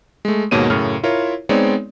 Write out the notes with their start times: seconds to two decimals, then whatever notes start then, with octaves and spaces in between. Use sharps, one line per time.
0.25 G#3 A3
0.51 D#2 G#2 B2 A#3 C#5 D#7
0.70 F#2 A2 C#3 A#4 F6
1.03 E4 F4 A#4 C#5
1.49 G#3 B3 C4 D#4 C#5 D5